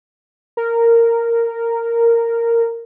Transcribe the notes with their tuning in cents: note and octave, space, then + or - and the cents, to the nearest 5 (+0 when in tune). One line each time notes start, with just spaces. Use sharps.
A#4 -10